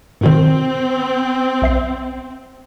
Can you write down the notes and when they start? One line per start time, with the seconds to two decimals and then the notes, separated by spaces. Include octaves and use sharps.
0.21 G#2 B2 D#3 C4
1.62 B1 E5 C7